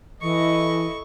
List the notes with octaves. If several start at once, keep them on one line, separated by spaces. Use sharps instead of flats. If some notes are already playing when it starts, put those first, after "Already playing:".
E3 E4 A4 D#5 C#6